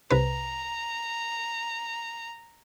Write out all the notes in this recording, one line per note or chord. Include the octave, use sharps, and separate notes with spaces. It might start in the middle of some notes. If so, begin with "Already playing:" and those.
C2 C3 B4 A#5